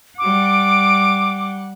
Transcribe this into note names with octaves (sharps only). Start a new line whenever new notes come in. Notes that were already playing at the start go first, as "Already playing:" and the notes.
G3 F#5 D6